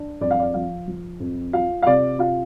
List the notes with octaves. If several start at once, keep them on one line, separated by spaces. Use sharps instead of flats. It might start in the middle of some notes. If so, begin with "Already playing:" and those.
Already playing: D4
F2 D5
F5
D5
F3 F5
F3
F2
F4 F5
F5
C3 D5
F4 F5